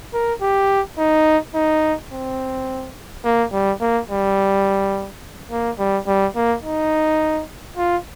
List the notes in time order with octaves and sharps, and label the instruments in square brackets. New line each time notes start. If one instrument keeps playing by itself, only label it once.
[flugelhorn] A#4
G4
D#4
D#4
C4
A#3
G3
A#3
G3
A#3
G3
G3
A#3
D#4
F4